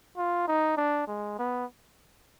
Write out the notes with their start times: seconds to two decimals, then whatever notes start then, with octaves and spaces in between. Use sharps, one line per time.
0.17 F4
0.48 D#4
0.77 D4
1.08 G#3
1.39 B3